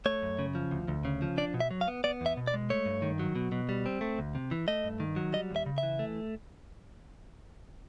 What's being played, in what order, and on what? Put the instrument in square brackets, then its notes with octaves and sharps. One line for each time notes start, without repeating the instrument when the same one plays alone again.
[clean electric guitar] A3 C#5
F#2
C#3
F3
D2
D2
C#3
F3
D4 D5
B2
E5
F#3
F5
B3
B3 D5
E2 E5
B2
D5
G#3
A3 C#5
G2
D#3
F#3
B2
B2
G3
C4
A3
D2
C3
E3
A3 D#5
G2
D#3
F#3
G3 D#5
D#2
E5
C#3
E5
E3
A3